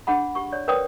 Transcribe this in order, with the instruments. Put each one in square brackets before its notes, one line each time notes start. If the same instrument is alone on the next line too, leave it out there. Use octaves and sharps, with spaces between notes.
[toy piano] D4 G#4 F#5 B5
G4 C#6
C#5 D5
A#4 B4 C#5 D5 G5 D#6